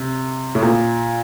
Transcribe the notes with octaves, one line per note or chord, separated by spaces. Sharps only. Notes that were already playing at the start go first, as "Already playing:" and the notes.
Already playing: C3
A2
A#2